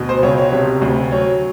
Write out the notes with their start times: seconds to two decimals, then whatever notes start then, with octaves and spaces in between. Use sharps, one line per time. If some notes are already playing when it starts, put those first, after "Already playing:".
Already playing: D2 B2
0.09 C5
0.23 C#2 C#5
0.38 C#5
0.52 C3
0.82 D2
1.11 F#3 C#5